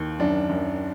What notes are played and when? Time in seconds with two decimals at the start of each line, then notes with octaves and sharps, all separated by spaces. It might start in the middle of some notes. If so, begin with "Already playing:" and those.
Already playing: D#2 D#3
0.20 F#2 D4
0.49 F#2